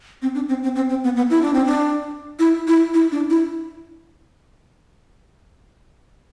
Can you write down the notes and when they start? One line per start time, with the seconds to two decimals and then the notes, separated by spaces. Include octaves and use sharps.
0.22 C4
0.35 D4
0.49 C4
0.63 C4
0.76 C4
0.89 C4
1.04 B3
1.16 B3
1.30 E4
1.42 D4
1.54 C4
1.65 D4
2.39 E4
2.68 E4
2.94 E4
3.12 D4
3.30 E4